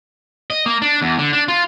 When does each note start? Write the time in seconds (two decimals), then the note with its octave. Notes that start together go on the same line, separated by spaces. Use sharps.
0.50 D#5
0.66 A#3
0.82 D4
1.02 E2
1.19 D3
1.33 D4
1.48 F4